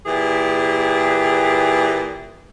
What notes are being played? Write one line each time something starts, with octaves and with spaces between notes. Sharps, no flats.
A#2 E3 G4 G#4